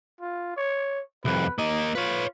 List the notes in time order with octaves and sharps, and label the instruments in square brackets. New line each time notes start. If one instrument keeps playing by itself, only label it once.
[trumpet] F4
C#5
[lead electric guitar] C2 F2 [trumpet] B4
[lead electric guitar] A#3 D#5 [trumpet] D#4
[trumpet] F4 [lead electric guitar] B4 C#5